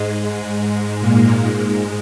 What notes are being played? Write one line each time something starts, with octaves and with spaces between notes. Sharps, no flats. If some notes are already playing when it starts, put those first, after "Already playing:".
Already playing: G#2 G#3
G#2 G#3
A#2 A#3
G#2 G#3